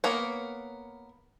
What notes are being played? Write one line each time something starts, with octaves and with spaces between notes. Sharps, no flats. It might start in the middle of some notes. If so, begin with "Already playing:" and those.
A#3 B3 A#4 C#5